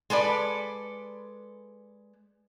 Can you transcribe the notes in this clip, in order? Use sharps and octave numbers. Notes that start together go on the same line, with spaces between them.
G#3 A4 B4 D5